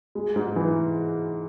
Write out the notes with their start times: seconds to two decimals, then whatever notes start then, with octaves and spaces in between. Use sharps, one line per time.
0.15 G#3
0.36 G#2
0.56 E3